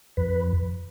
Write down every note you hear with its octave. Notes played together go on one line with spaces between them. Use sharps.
F2 B4